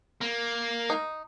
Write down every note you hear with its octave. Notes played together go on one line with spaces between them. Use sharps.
A#3
D#4